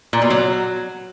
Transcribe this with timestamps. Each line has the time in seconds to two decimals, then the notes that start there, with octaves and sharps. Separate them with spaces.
0.13 A#2
0.22 B2
0.30 F#3